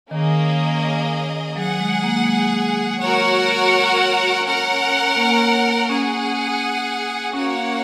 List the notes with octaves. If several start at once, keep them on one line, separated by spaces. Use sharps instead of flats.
D#3 A#3 C#4 G#4 D#5
F#3 G#4 F#5
G#3
A#3
G#3
F#4 A#4 C#5 F#5
C#4 A#4 F#5
A#3
C#4 G#4 F#5
A#3 C#4 F#4 C#5 F#5